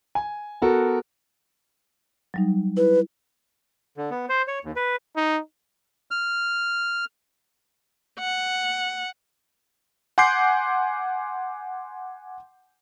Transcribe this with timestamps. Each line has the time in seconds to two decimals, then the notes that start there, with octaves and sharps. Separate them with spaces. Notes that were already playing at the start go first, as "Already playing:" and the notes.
0.15 G#5
0.62 B3 F#4 A4 A#4
2.34 F#3 G3 D#4
2.77 E4 B4
3.97 D3
4.11 B3
4.29 C5
4.47 C#5
4.65 D#2
4.76 B4
5.16 D#4
6.11 F6
8.19 F#5
10.18 F#5 G#5 C6 D6 G6 C7